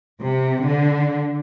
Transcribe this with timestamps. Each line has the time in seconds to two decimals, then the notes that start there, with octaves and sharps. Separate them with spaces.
0.22 C3
0.67 D3